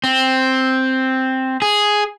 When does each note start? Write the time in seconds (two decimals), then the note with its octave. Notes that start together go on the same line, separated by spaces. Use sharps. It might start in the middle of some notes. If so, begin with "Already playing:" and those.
0.04 C4
1.62 G#4